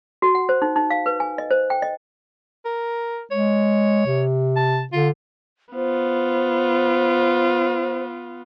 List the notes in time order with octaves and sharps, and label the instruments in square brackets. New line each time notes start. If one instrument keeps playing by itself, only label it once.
[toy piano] F#4
F#5
C5
D#4
D#4
F5
B4
G#5
D#5
C5
G5
D#5
[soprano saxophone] A#4
[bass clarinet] G#3 [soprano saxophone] C#5
[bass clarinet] C3
[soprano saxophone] A5
[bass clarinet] D3 [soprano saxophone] F4
[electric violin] B3 F4 [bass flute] C5